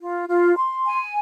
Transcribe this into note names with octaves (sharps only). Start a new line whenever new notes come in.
F4
F4
C6
G#5